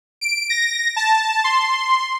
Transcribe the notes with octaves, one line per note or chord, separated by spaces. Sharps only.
D7
A#6
A5
C6